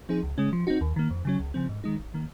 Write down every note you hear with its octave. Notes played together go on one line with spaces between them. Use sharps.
F3 C4 D#4 G#4
C#2
C#3 G#3 C#4
F3
C4 D#4 F#4
D#2
D#3 A#3
F2
C#3 F#3 C#4
C#2
C#3 F3 C4
G#2
D#3 G#3 D#4
G#1
D#3 A#3